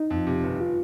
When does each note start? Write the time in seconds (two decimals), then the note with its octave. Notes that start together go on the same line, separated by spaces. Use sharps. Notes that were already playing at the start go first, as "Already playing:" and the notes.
Already playing: D#4
0.10 F2
0.27 C3
0.44 G1
0.61 F4